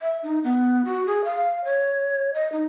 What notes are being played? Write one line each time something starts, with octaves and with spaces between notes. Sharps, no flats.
E5
D#4
B3
F#4
G#4
F5
C#5
D#5
D#4